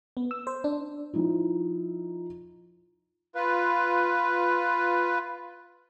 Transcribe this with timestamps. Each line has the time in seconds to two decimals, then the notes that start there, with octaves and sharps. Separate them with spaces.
0.17 B3
0.31 E6
0.47 C5
0.64 D4
1.14 F3 D#4 E4
3.35 F4 B4